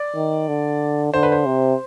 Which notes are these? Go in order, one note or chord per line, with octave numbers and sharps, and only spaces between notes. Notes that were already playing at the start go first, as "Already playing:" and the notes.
Already playing: D5
D#3
D3
D3 C5
B4
C5
C3